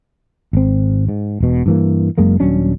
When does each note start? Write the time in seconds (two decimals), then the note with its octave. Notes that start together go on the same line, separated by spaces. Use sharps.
0.53 G#1 C4
1.09 G#2
1.40 E1 B2
1.66 G2 E3 A#3
2.18 F#1 F#2 G#3 A#3
2.40 D#1 F#3 C#4 D4